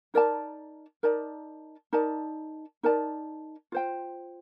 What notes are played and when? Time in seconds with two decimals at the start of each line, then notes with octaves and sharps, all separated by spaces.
0.14 D#4 A#4 D5 A5
1.03 D#4 A#4 D5 A5
1.93 D#4 A#4 D5 A5
2.83 D#4 A#4 D5 A5
3.72 F4 C5 G5